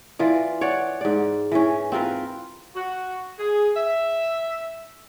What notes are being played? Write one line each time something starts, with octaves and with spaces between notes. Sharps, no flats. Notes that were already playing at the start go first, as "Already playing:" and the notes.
E3 F4 D5
C#5 D5 F#5
G#2 D5
E3 C#4
C4 F4 A#4 B4
F#4
G#4
E5